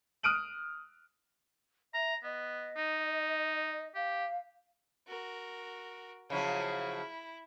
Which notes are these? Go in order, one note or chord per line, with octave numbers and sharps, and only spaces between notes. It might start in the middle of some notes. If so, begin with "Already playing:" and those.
D#6 F6 F#6 D7 D#7 F#7
E5 A#5
B3 D#5
D#4
G4 F5
F#4 A#4
C#3 F3 F#3 E4